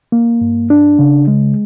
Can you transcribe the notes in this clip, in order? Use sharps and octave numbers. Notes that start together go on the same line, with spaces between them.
A#3
G2
D4
C#3
G#3